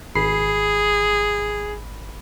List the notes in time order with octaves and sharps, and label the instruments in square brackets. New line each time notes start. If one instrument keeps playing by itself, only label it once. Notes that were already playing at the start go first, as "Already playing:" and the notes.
[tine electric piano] G#1 B5 C7 [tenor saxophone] G#4